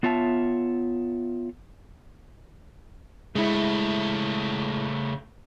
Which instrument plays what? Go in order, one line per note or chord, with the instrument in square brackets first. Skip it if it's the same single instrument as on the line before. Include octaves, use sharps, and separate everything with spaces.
[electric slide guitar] B3 F4 C#5 E5 A5
[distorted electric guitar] C#3 A3 [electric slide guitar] G#3 E4